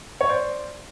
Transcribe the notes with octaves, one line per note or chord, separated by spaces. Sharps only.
C#5
C5 D5